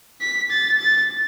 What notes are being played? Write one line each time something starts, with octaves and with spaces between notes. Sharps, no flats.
B6
A6
A6